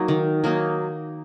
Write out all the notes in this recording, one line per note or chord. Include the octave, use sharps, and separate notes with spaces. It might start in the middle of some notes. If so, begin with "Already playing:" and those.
Already playing: F#3 A#3 D#4
D#3
F#3 A#3 D#4